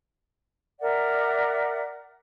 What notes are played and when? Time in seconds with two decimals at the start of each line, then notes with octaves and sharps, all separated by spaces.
0.80 A#4 D5 E5 F#5